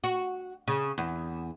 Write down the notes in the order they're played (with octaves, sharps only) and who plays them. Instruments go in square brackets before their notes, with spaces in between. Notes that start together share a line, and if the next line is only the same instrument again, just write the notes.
[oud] F#4
C#3
E2